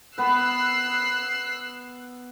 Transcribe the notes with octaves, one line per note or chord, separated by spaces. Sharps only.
B3 B4 E6 F#6 C7